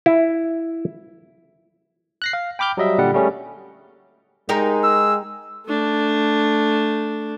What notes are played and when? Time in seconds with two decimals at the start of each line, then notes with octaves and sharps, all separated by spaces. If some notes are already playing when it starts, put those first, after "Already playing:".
0.06 E4
2.22 F#6 A#6 C7
2.33 F5
2.59 G5 B5 D6 F6 G6
2.77 F#3 G3 D#5 E5
2.98 A#2 D3 G3 F#5
3.14 G3 A3 C#4 G#4
4.49 G#3 D#4 G4 A#4
4.84 E6
5.66 A3 D4